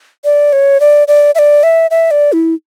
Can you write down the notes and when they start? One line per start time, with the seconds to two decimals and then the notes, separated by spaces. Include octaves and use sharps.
0.25 D5
0.53 C#5
0.80 D5
1.08 D5
1.35 E5
1.39 D5
1.63 E5
1.91 E5
2.11 D5
2.33 E4